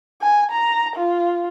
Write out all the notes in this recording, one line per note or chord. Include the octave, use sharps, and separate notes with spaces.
G#5
A#5
F4